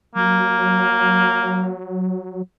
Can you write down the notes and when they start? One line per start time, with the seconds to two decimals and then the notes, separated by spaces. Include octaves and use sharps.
0.15 F#3 A#3